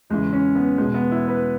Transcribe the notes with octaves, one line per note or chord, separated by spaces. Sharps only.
E2 C#3 E3 G#3
C#4
B3
E2 B2 G#3
B3
E4
B4